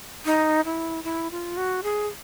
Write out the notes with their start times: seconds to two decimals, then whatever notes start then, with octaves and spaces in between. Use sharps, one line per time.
0.25 D#4
0.65 E4
1.04 E4
1.31 F4
1.57 F#4
1.83 G#4